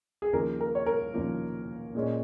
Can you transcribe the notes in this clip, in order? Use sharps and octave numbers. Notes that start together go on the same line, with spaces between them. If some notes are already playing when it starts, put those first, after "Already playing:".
G#4
D#2 C#3 F3 A#3 A#4
A#4
C#5
A#4
D#2 C#3 F3 A#3
A#2 G#3 C#4